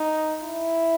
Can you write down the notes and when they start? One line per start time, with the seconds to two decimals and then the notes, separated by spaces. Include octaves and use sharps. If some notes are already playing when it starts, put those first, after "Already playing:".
Already playing: D#4
0.42 E4